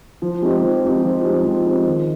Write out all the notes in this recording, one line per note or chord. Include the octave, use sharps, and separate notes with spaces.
F3
G#3 C4 D#4 G4
F3
G#3 C4 D#4 G4
F3
G#3 C4 D#4 G4
F3
G#3 C4 D#4 G4
D#3